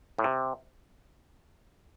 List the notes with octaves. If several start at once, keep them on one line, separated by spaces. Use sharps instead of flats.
A2
C3